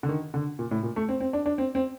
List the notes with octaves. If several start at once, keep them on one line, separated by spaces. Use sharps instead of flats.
D3
D#3
D3
A#2
A2
A#2
A3
C4
C4
D4
D4
C4
C4